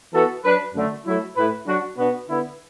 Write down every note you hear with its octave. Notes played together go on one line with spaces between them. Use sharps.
E3 B3 F#4 A4
F#3 D4 B4
F#2 D3 A3
F#3 A3 E4
A2 A3 E4 B4
F#3 D4 F#4
B2 B3 D4 F#4 B4
D3 B3 E4